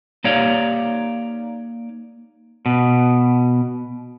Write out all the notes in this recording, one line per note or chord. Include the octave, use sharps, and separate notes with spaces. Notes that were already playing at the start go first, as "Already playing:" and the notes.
A#3 D#4 G4 C#5 D5 F5
B2